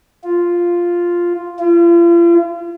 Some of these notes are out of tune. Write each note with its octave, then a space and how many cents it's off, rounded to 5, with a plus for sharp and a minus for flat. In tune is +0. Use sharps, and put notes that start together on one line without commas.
F4 +0
F4 -40